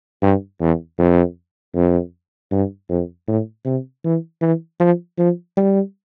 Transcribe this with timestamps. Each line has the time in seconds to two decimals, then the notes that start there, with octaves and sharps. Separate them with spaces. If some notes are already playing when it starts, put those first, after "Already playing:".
0.22 G2
0.61 E2
0.99 F2
1.75 F2
2.52 G2
2.89 F2
3.28 A2
3.66 C3
4.04 E3
4.41 E3
4.80 F3
5.18 F3
5.57 G3